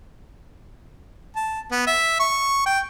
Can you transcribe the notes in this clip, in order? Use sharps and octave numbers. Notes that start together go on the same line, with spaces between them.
A5
B3
E5
C#6
G5